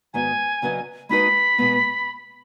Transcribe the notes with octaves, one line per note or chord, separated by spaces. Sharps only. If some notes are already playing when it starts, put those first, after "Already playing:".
G#2 D#3 B3 F#4 D#5 G#5
C#3 F#3 C#4 B4 D#5
G#3 D#4 F#4 B4 D#5 B5
B2 G#3 B3